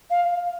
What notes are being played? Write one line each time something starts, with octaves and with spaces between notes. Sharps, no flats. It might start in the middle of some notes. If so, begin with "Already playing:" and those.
F5